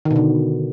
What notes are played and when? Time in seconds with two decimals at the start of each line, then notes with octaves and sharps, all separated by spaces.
0.05 D#3
0.11 B2
0.16 D3